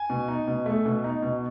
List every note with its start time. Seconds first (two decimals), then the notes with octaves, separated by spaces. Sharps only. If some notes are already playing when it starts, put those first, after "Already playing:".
Already playing: G#5
0.10 B2
0.28 D#4
0.48 B2
0.66 A3
0.86 B2
1.04 D#4
1.22 B2